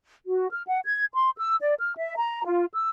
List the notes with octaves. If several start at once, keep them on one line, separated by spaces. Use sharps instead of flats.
F#4
F6
F#5
G#6
C6
E6
D5
F6
E5
A#5
F4
E6